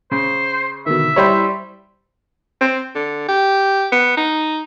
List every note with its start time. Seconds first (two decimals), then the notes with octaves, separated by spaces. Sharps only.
0.11 C#3 C5
0.86 B2 D3 D#3 E5
1.16 G3 E4 C5 C#5
2.61 C4
2.95 D3
3.28 G4
3.92 B3
4.17 D#4